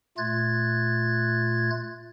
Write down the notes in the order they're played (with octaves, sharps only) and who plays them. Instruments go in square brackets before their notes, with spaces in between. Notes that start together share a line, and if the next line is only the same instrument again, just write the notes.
[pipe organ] A#2 A3 F4 F#6 G#6 A6